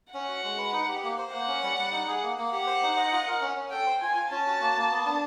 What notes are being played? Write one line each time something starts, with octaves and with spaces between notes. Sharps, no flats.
C#4 F#5
F#4
G#3
B4
D#4
G4
A#3
C5
A#3 F#5
C#4
G3
G3
D#4
G#4
A#3
A#3
G4 F#5
C5
D#4
D#5
F4
A#4
C#4
C#4
A4 G5
C5
F4 G#5
F4
C#4 A5
F#4
A#3
A#3
B3
D4